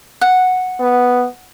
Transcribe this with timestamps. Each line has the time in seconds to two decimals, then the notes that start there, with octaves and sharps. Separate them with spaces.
0.21 F#5
0.80 B3